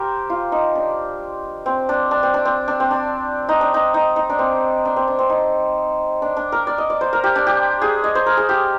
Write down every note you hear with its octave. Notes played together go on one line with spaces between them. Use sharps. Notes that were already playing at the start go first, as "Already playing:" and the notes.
Already playing: G4 A#4 C5
F4
D#4
D4
C4
D4
D4
C4
D4
C4
D4
C4
D4
D#4
D4
D#4
D#4
D#4
D4
C4
D4
C4
D4
C4
D#4
D4
D4
A#4
D5
D#5
D5
C5
A#4
G4
D4
G4
G#4
D#5
C5
A#4
G#4
G4